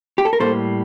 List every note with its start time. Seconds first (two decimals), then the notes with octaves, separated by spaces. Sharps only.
0.18 G4
0.25 A4
0.33 A#4
0.40 A2 G3 A#3 A4 C5